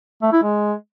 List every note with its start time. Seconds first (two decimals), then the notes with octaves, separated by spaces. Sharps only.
0.22 A3
0.32 E4
0.43 G#3